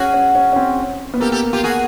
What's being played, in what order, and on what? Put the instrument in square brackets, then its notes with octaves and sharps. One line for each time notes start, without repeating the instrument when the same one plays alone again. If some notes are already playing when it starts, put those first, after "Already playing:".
Already playing: [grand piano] C#4 [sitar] F#4 G#4
[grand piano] C#4
C#4
C#4
C4
B3
[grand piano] A#3 [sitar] G4 A4
[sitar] G4 A4
F4 G4
F#4 G#4